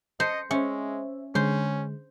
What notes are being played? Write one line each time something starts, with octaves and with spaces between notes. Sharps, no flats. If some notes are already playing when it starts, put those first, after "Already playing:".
C5 D#5 A5 A#6 C#7
G#3 C#4 C5 E5
D3 G#3 C#4 C5